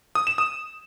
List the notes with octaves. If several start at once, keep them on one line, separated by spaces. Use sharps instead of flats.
D#6
E7
D#6